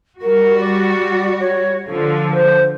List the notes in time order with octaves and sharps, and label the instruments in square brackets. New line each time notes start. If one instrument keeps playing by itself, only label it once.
[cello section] G3 F#4 [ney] A#4
[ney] D5
C#5
[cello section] D3 F3 [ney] A4
[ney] C5